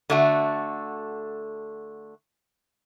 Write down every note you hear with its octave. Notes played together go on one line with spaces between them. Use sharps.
D3 A3 F#4